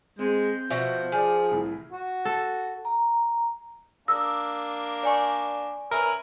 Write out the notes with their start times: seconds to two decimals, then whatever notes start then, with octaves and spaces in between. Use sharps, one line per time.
0.19 G#3 C4 G6
0.70 B2 F3 F#4 E5
1.12 G#4 D5 F6
1.51 C2 A2 E3
1.92 F#4
2.25 A4
2.85 A#5
4.08 A#3 D4 A#4 D#6 E6 A#6
5.03 D5 G#5 C#6
5.91 C#4 A#4 B4 E5